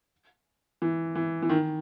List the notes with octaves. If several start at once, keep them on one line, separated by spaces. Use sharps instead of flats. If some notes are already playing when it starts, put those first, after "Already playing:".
E3
E3
E3
D#3